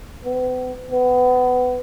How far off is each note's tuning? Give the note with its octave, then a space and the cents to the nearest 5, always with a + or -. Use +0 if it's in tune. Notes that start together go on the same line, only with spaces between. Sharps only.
B3 +40
B3 +20